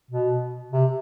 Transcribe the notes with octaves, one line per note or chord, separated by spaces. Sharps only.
B2
C3